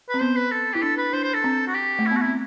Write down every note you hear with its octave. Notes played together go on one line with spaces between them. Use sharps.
C4 B4
B3 C5
B4
A4
E4 G4
D4 A4
B4
D4 C5
C5
A4
C4
F#4
G4
A3
E4
B3 F#4
C4 E4